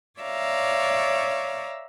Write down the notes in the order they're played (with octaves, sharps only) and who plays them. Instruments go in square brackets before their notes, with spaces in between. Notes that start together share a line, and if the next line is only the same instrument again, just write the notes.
[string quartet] C#5 D5 E5 F5 A#5